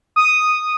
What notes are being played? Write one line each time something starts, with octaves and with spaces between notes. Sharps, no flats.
D#6